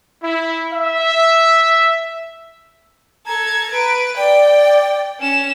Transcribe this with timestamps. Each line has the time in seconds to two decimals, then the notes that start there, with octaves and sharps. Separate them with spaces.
0.23 E4
0.73 E5
3.26 A4 A#5 G#6
3.70 B4 D7
4.17 D5 G5
5.20 C#4 E7